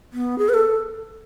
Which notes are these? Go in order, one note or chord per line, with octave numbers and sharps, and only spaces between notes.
B3
G#4
B4
A4